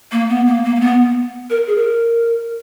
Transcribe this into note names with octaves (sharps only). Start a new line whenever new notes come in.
A#3
B3
A#3
A#3
A#3
B3
A#4
G#4
A#4